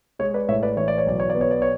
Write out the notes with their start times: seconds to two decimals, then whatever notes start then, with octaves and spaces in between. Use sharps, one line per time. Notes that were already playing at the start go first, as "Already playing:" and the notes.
0.19 G#3 C#5
0.34 B4 D5
0.49 A2 C#5 E5
0.63 B4 D5
0.77 E3 C#5
0.88 D5
0.98 C#5
1.07 B1 D5
1.20 C#5
1.30 D5
1.35 B3
1.41 C#5
1.51 D5
1.62 C#5